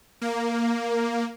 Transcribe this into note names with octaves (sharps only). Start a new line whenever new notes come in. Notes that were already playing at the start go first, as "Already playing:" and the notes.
A#3